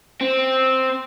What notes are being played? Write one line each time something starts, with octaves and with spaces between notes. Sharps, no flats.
C4